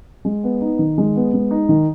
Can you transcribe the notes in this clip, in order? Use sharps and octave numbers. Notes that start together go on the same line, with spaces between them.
G#3
B3
D#4
D#3
G#3
B3
G#3
D#4
D#3